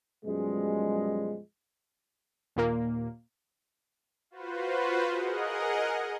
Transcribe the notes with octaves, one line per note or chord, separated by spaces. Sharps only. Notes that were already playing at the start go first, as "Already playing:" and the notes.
F#2 B2 F3 G3 G#3
D#2 A#2 A#3
F4 F#4 B4 C5
G#4 A#4 D#5 F#5